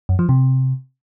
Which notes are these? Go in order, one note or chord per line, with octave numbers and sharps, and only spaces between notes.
F#2
F3
C3